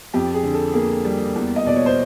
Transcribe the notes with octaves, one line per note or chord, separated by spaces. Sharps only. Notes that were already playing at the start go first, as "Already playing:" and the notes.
F2 G4
G#4
D3
A4
A#3 G#4
G3
E2
D#5
B2 D5
C#5
C5